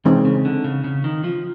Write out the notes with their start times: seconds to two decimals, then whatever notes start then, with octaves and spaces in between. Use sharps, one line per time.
0.05 C3 E3 G#3 C4 D#4
0.25 C#3
0.45 D3
0.64 C#3
0.84 C#3
1.04 D#3
1.24 F3